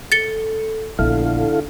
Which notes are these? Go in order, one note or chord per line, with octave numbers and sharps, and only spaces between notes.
A4 A6 C#7 G7
A#1 D3 B3 E4 A4 F5